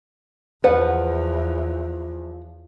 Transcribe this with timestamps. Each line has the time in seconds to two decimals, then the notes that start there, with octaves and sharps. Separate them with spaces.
0.64 E2 F3 B4 F#5